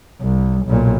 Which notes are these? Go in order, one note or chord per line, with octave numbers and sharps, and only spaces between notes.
C2
B1 A#2